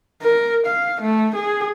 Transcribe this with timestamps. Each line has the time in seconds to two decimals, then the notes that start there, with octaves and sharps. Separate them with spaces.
0.22 A#4
0.66 F5
1.01 A3
1.35 G#4